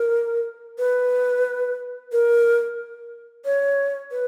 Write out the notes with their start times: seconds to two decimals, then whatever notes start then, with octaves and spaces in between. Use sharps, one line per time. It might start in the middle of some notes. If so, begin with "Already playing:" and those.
Already playing: A#4
0.79 B4
2.12 A#4
3.45 C#5
4.12 B4